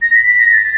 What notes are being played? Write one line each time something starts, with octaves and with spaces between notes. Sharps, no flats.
A#6
B6
B6
A#6
A6